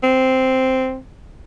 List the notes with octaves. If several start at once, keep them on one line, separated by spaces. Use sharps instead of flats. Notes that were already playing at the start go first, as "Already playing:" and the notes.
C4